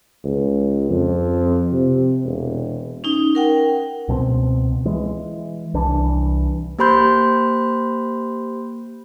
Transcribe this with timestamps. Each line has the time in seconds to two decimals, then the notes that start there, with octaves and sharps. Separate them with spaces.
0.25 C#2
0.90 F2
1.72 C3
2.24 E1
3.04 C#4 D#4
3.35 A#4 F#5 G5
4.08 C#2 B2 F3 C4
4.85 E3 G#3
5.74 C2 E3 D4
6.79 A#3 G4 C5 B5 C6 G6